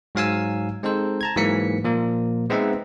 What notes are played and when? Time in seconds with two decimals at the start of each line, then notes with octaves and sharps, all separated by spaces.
0.15 G#2 F#3 F5 G#5 E6
0.83 G#3 C4 D#4 A4 C5
1.21 A5 A#5 G#6
1.36 G#2 E3 F#3 A#3 B6 C#7
1.84 A#2 F3 A#3
2.50 G#3 B3 C4 D#4 E5 F#5